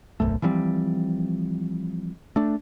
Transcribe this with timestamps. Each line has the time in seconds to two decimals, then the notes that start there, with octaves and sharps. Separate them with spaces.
0.20 D1 B1 F#2 A3
0.42 E3 F3 G3 C4
2.36 A3 D4